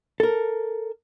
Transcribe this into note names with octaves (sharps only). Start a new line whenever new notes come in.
A4 A#4